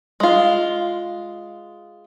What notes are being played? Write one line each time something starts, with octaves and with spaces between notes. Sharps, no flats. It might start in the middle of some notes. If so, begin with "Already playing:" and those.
G#3 F4